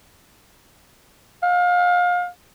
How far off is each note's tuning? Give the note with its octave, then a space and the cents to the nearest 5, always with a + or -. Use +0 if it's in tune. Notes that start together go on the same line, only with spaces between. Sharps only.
F5 +30